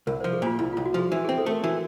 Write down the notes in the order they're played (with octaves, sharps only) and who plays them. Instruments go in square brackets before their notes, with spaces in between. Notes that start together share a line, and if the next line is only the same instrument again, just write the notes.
[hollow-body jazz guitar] C2 [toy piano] A#4
[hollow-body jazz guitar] F3 [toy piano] C5
[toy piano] G#4
[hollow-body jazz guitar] A#2 [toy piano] F4
[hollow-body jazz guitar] C2 [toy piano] E4
[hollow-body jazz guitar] C2 [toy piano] F4
[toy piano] F#4
[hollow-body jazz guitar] F3 [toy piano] G#4
[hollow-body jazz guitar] E3
[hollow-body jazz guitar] C4 [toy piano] G#4
[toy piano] A4
[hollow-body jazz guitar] A3 [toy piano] A#4
[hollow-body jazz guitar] E3 [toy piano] F#4